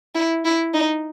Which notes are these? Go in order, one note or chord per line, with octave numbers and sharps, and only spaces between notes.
E4
E4
D#4